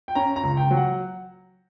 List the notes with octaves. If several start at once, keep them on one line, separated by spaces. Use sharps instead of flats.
G5
C#4 A#5
A#5
C#2
G5
F#3
F#5